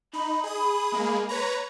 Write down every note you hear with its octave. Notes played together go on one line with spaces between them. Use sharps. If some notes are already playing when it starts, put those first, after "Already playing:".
D#4 B5
G#4 D#6
G#3 A#3 G#4
B4 C#5 A#5